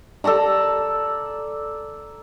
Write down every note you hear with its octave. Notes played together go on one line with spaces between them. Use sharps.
A4 D5 A5 A#5